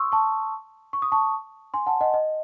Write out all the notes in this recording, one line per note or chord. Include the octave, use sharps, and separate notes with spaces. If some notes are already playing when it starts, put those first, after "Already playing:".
Already playing: C6 C#6 D#6 E6
A5 C#6
C#6
D#6
A5 C#6
G#5 C6
F#5 A5
D#5 F#5
D#5